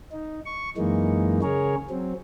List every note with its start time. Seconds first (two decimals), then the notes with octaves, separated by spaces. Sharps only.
0.12 D#4
0.46 C#6
0.77 F#2 E3 G#3 A#3 D#4
1.43 C#3 G#4 A#4 C#5
1.90 F#3 C4